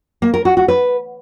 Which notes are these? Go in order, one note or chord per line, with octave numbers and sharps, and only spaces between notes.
A#3
A#4
F#4
F#4
B4